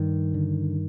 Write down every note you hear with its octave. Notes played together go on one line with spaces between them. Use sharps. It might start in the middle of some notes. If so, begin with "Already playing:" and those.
Already playing: G2 D#3
D3